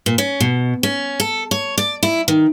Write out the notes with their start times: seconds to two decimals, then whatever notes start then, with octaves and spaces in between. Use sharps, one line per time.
0.06 A#2
0.18 C#4
0.40 B2
0.83 C#4
1.20 A4
1.51 C#5
1.78 D5
2.03 E4
2.28 D#3